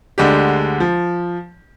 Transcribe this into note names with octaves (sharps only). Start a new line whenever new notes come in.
D2 D3 G#3 D4 G4
F3